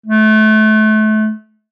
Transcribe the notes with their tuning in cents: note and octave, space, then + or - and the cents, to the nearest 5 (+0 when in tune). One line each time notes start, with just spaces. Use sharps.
A3 -30